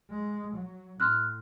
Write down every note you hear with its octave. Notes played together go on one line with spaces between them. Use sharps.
G#3
F#3
A2 C6 F6 F#6